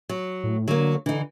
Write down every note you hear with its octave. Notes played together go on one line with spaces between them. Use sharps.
F#3
A2
D3 F#3 A#3
D3 E3 D#4